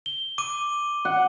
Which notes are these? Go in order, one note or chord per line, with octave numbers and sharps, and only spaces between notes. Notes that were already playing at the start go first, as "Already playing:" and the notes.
G7
D6 D#7
F#5